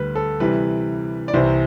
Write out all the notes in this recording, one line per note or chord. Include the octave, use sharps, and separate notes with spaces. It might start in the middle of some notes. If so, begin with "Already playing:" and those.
Already playing: D2 D3 G3 B4
A4
C3 E3 G3 B4
D5
C2 C3 E3 C5